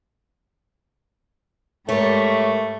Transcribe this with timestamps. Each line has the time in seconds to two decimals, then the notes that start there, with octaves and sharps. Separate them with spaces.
1.89 G#2 G3 A3 A#4 C#5